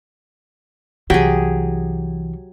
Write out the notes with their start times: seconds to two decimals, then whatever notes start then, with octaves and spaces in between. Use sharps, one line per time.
1.10 C2 E3 F#3 G4 G#4